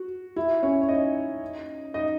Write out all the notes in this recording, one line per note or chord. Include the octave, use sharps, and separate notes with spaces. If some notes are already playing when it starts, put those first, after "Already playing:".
Already playing: F#4
E4
C#4 C#5
C#5
D#4 D#5
D#4 D#5